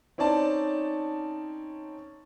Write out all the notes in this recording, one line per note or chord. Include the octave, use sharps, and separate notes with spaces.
C4 C#4 D#4 D5 A5